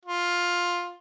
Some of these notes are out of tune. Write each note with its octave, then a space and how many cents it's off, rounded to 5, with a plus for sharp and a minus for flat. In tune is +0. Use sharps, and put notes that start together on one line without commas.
F4 +10